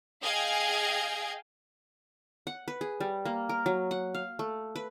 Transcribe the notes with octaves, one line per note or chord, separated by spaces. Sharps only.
G#4 D#5 F5 G5 G#6
F#5
B4
G#4
G3
A#3
A#4
F#3
F#5
F5
A3
B4